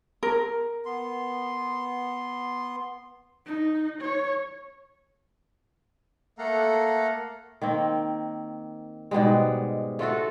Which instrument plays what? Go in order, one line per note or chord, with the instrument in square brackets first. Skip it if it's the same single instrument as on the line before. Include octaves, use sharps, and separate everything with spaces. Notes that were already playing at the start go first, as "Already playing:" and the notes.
[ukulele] A#4
[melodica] B3 C6
[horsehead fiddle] D#4
C#5
[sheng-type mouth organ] A3 A#3 A4 F5 F#5 A#5
[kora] D#3 A#3 C4
G#2 B2 G3 G#3
A3 F4 F#4 A4